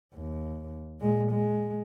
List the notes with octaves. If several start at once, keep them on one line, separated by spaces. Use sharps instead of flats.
D#2
A#2 G#3
G#3